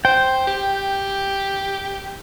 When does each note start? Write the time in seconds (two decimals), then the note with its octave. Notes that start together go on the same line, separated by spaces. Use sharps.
0.05 C5 G5
0.47 G4